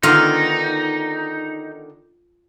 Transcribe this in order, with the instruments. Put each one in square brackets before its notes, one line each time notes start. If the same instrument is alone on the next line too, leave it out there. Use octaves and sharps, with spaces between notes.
[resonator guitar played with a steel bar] D3 D#3 B3 [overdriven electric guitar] D#4 [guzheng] F4 F5